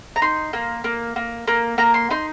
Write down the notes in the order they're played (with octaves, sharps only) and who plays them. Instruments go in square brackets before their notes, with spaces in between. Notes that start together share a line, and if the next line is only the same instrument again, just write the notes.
[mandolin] A#5
D#4 C6
A#3
A#3
A#3
A#3
A#3 A#5
C6
D#4 C6